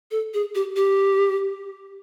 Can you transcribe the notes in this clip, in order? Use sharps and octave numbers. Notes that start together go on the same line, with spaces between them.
A4
G#4
G4
G4